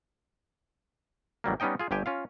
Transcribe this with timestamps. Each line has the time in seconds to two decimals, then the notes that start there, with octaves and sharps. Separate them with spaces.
1.44 A1 F#3 G3 A#3
1.60 G3 B3 C#4 D#4 D#5 G5
1.80 F4 G#4
1.91 G1 G2 G4 G5 G#5
2.06 C#4 F4 F5